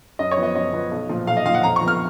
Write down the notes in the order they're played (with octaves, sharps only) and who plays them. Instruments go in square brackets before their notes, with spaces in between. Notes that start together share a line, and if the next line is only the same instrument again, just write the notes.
[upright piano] F#2 D#5
C#5
F3 B3
D#5
F#2 D#5
F3 B3
B1
A#2 F3
B1 F5
D#5
A#2 F3 F5
F#5
F2 A#5
C#6
F3 B3
F6